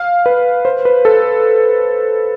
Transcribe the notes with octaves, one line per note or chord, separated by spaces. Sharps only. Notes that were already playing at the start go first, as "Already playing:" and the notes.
Already playing: F5
B4
C5
B4
A4